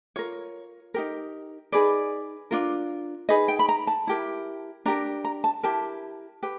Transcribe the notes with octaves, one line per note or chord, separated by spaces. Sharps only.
F4 A#4 C#5
D#4 G4 A#4
D#4 G#4 B4 D5
D4 F4 A#4
D#4 G#4 B4 D#5
G5
B5
A#5
A5
E4 G4 A#4
D4 G4 A#4 A#5
A#5
A5
E4 G4 A#4 A5
G4 B4